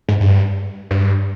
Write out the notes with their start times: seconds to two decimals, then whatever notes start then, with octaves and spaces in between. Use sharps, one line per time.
0.08 G#2
0.20 G2
0.91 G2